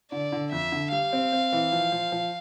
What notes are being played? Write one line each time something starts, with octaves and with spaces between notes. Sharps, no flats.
D3 D5
D3
F2 E5
D3
G3 F5
C4
C4
E3
F3
F3
F3